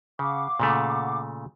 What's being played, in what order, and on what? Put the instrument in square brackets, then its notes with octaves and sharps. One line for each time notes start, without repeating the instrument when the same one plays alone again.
[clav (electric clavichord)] C#3 [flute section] F5 F#5 D6
[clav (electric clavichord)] A#2 C#3 A3